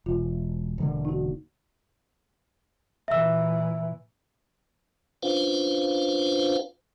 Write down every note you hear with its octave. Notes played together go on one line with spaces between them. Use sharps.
E1 F4
E1 D3 A#3
D#4 F#4
A#2 E3 E5 E6
C#4 D4 F4 B4 C5 F5